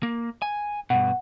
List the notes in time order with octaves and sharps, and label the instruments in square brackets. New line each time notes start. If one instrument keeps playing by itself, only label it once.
[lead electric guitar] A#3
G#5
[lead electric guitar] G2 B2 [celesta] F#5